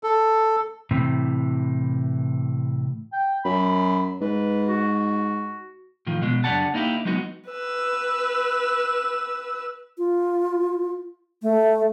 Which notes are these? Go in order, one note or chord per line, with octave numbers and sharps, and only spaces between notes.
A4
A2 C3 E3
G5
F#2 B5
G#2 B4
F#4
A2 D#3 F3
B2 G#3
F#2 D3 G4 D5 F#5 A5
A#3 D#4 E4 G4
F#3 G#3 B3 D#4 F#4
B4 E6
F4
A3